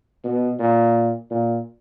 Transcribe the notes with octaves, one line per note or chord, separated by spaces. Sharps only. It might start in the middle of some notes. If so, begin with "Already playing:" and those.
B2
A#2
A#2